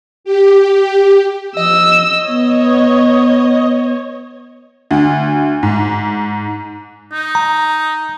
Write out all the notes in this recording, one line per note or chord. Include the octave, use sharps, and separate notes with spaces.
G4
F3 D#5 E6
B3 C#5
D2
G#2
D#4
A#5